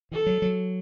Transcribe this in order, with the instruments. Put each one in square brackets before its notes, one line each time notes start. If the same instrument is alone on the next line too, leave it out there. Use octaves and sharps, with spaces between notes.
[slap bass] E3 [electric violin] A4
[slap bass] F#3
F#3